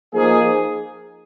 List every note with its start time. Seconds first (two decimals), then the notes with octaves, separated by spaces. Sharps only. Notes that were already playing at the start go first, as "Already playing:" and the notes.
0.13 F3 A#3 D#4 G#4